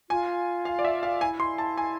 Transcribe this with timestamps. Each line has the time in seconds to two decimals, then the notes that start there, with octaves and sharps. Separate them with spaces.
0.10 F4 G#5
0.65 F5
0.79 D5
0.85 E5
1.03 F5
1.21 E4 G#5
1.40 C6
1.58 A5
1.77 G#5